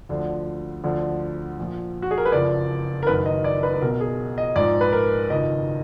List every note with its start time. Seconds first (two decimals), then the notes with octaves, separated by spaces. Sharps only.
0.09 D2 D3 F3
0.84 D2 D3 F3
1.58 A#1 A#2 F3
2.02 F#4
2.11 G#4
2.18 A#4
2.25 B4
2.32 F#1 F2 F3 D5
3.03 A#4
3.06 F#1 F#2 D#3 B4
3.26 D#5
3.44 D5
3.63 B4
3.74 B4
3.82 B1 B2 A#4
4.01 G#4
4.38 D#5
4.56 A#1 G#2 F3 D5
4.81 B4
4.93 A#4
5.30 F#1 F2 D#3 D#5